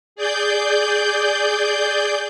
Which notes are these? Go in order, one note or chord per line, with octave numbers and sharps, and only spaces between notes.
G#4 D5 G6